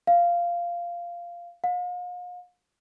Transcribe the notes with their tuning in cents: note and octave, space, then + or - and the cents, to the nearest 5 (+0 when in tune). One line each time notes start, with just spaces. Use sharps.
F5 -10
F5 +45